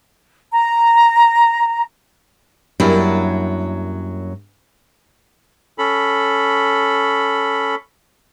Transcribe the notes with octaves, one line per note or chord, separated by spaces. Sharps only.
A#5
F#2 F#3 G3 A#3 D4 E4
C#4 A4 B5